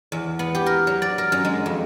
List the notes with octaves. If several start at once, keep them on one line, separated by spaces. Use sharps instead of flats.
E2
B3
G4
A#4
F#3
D5
A#4
F#2
G#3
F2